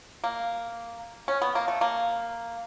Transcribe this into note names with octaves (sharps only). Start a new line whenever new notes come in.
A#3
C#4
B3
A#3
A3
A#3